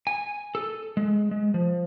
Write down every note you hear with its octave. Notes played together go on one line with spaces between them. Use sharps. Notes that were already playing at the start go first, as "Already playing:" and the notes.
G#5
A4
G#3
G#3
F3